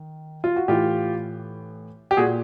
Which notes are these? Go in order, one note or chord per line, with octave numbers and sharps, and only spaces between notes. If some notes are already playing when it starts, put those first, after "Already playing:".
Already playing: D#3
F4
F#4
A2 E3 F4 G4
G4
A#2 F#4 G#4